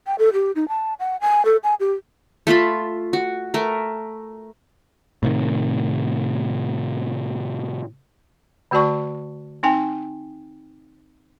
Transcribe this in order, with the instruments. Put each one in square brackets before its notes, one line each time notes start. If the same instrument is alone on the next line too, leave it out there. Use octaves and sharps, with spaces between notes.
[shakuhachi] G5
A4
G4
D#4
A5
F#5
G#5
A4
G#5
G4
[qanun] A3 F4 A5 B5
F#4
A3 A#4
[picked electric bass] A2 C3 D#3
[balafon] D3 A3 F#4 D5 A5 C#6
C4 D#4 G5 G#5